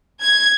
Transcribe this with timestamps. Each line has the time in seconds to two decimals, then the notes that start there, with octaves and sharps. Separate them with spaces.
0.23 G#6